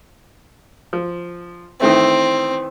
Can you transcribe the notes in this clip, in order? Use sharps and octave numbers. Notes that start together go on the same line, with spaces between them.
F3
D#3 E3 A3 C4